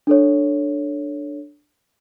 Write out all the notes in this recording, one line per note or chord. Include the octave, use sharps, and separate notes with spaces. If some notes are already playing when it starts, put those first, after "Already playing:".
D4 A4 C#5